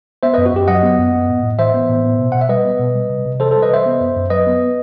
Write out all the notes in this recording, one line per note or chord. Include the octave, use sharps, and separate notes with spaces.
B3 C5 E5
F#2 B4 D#5
F#4
F#2 G4
F#3 D#5 F#5
B3
F#2
B3
A2
A2
E3 C5 E5
B3
A2
B3
B2
B2 F#5
E5
G3 B4 D#5
B3
B2
G3
C3
C3
E3 A4 C5
G3 A4 C5
B4 D#5
C3 C5 E5
B3
F#2
F#2
F#3 B4 D#5
B3